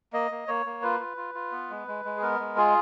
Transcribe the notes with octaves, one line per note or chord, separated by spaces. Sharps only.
A#3 D#5
A#3
A#3 C#5
A#3
F4 B4
F4
F4
F4
B3
G#3
G#3
G#3
G#4
B3 A#4
G#3
F4 G#4